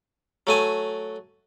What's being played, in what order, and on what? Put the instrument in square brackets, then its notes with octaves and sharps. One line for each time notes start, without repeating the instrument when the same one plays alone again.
[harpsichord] F#3 A3 G#5